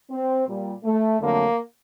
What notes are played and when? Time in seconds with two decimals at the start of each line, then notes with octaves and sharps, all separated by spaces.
0.11 C4
0.48 A#2 G3
0.84 A3
1.20 F2 D3 F#3 A3 A#3